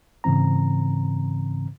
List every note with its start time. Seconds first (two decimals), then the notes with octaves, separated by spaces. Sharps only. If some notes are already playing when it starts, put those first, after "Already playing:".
0.24 G#2 C#3 E3 C4 A#5